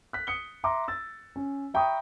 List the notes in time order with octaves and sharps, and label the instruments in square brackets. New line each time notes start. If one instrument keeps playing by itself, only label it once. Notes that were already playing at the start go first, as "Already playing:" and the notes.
[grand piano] F#6 B6
D#6 C#7 G7
E5 A#5 C6 D6
E6 A6
C#4
E5 G5 A#5 B5 C#6 D#6